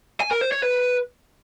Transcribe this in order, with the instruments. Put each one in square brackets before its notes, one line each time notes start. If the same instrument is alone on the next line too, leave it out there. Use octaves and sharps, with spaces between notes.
[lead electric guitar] G#5
A#4
C5
C#5
B4